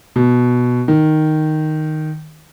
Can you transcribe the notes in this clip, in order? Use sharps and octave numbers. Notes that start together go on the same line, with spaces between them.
B2
D#3